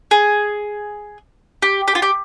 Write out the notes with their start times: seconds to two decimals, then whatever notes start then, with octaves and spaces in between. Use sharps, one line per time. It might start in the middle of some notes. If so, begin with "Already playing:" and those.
0.11 G#4
1.62 G4
1.88 G4
1.95 F4
2.02 G4